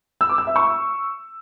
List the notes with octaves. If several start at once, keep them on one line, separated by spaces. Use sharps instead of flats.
E6
D6
E6
E5
C#6